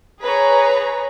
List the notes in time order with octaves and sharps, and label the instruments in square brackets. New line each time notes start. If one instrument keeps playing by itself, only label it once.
[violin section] G#4 B4 C#5 A#5